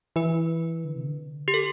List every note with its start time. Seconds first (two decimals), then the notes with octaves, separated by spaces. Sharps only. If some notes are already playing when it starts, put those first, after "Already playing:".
0.16 E3 B4
0.85 D3
0.96 C3
1.06 D3
1.48 G4
1.54 A4